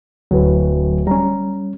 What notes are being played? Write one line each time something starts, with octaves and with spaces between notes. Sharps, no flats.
D1 F#3 B4
G3 C#4 A#5